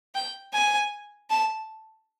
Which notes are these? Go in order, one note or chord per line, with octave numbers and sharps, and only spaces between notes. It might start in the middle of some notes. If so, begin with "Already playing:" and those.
G5
G#5
A5